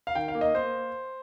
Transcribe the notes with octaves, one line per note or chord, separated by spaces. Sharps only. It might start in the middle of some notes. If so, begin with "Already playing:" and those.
F5
D#3 G5
F5
A#3
D#5
A#3 C5